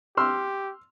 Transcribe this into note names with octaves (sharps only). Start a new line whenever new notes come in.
G4 C6 E6 F6